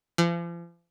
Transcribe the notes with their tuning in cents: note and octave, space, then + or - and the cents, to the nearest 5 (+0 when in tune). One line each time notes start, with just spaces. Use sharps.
F3 -40